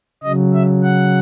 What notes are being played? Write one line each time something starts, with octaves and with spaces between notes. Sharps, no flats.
C#3 F#3 D#5
E5
F#5